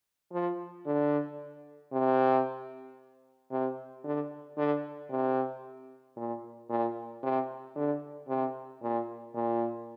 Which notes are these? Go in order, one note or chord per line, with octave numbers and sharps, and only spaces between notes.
F3
D3
C3
C3
D3
D3
C3
A#2
A#2
C3
D3
C3
A#2
A#2